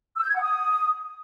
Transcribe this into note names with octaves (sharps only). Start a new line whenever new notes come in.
E6
G6
G#6
F#5
D#6